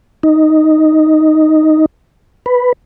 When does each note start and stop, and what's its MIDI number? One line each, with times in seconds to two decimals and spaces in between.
0.23 1.86 63
2.46 2.73 71